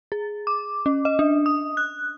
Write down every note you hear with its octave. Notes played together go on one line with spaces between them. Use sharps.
G#4
D6
C#4
D#5
D4
D#6
F#6